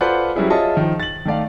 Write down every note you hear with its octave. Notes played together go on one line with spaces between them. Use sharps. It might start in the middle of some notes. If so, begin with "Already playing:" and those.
F4 A4 B4 C5 D5 F#5
F#3 G3 C#4 E4 G#4
F4 G#4 C#5 D#5 E5 A5
D#3 F3
A6 F#7
D#3 A3 D5 F5